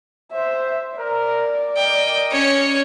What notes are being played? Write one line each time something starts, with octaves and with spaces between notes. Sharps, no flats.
C5 E5
A#4 D5
A#4 D#5 G5
C#4 C#5